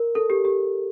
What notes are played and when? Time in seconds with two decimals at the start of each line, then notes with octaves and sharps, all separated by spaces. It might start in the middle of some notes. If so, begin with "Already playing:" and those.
Already playing: A#4
0.15 A4
0.30 G4
0.45 G4